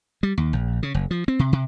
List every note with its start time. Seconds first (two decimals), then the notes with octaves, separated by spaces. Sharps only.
0.23 G3
0.38 D#2
0.53 A#1
0.83 C#3
0.94 F#1
1.11 F3
1.28 C4
1.39 C3
1.53 C3